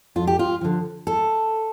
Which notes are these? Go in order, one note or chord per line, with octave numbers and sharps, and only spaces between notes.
F2 F4
G4
F4
D3 F3
A4